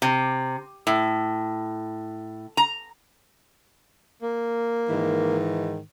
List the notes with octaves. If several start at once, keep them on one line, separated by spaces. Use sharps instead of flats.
C3
A2
A#5
A#3
G#2 D#3 E3